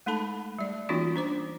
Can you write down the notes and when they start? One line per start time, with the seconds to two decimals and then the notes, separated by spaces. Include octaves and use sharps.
0.06 G#3 A3 D#4 A4 A5 B5
0.59 G3 D5
0.89 E3 A#3 C#4 D#4 F4 F#4
1.16 D4 C5 D6